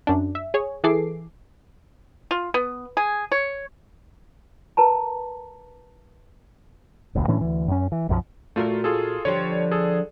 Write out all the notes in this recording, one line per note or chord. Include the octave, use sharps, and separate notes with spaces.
F#2 D4
E5
G#4 C#5
E3 G#4 A4 D6 C7
F4
B3
G#4
C#5
A#4 B4 A5 A#5
D#1 A1 D2
A2 E3 C#4 D4
D2 E3
F#2 C#4
E3
B1 F#2 E3 F3
A#2 A3 F4 F#4 A#4
F4 G#4 A4
D3 F3 G3 C#5
G#4 A4